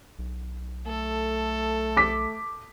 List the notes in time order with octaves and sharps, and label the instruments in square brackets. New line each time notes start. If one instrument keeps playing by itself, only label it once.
[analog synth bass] B1
[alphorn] A3 [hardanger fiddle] A4
[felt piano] D6 B6